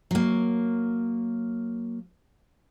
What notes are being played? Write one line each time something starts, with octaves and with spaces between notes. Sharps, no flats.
F#3 A#3